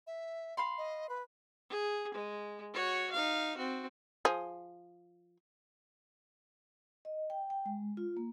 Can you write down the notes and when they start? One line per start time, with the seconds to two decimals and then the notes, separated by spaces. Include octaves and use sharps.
0.07 E5
0.57 F5 B5 C6
0.78 D#5
1.09 B4
1.70 G#4
2.14 G#3
2.74 F#4 C#5
3.12 D#4 F5
3.57 C4 F#4
4.25 F3 G#4
7.05 D#5
7.30 G5
7.50 G5
7.66 G#3
7.97 F4
8.17 A#3